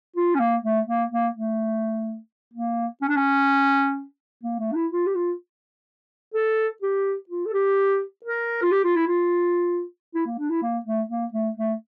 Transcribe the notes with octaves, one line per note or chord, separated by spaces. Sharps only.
F4
C#4
A#3
A3
A#3
A#3
A3
A#3
C#4
D4
C#4
A#3
A3
D4
E4
F4
G4
F4
A4
G4
F4
A4
G4
A#4
F4
G4
F4
E4
F4
E4
A#3
D4
E4
A#3
A3
A#3
A3
A3